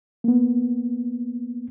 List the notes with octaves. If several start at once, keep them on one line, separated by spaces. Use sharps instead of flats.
A#3 B3